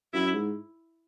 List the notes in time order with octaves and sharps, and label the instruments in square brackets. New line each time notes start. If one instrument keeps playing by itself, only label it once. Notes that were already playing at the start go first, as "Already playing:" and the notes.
[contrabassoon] F#2 [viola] E4
[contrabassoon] G#2